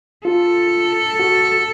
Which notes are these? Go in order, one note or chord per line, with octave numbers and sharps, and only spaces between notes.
F4 A4
F#4